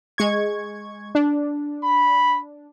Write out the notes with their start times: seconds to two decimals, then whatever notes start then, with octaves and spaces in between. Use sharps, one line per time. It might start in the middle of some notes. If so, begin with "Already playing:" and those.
0.18 G#3 C#6 G#6
1.15 D4
1.84 B5